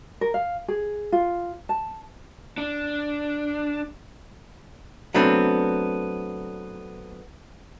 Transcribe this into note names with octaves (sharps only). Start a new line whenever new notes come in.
A#4
F5
G#4
F4
A5
D4
F#3 A3 B3 C4 D4